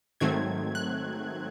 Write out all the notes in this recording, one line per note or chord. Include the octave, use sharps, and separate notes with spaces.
G#2 D#3 F#3 A3 C4 G#6
F#6